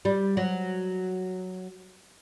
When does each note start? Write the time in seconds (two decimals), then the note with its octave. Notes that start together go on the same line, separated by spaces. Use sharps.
0.05 G3
0.37 F#3